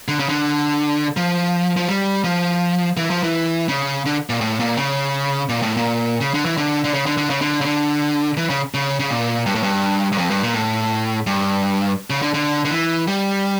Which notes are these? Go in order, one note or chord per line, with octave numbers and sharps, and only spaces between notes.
D3
C#3
D3
F3
F3
G3
F3
E3
F3
E3
C#3
D3
A#2
A2
A#2
C#3
A#2
A2
A#2
C#3
D3
E3
D3
D3
C#3
D3
D3
C#3
D3
C#3
D3
E3
C#3
C#3
C#3
A#2
G2
A2
G2
G2
F2
G2
A#2
A2
G2
C#3
D3
D3
D3
E3
G3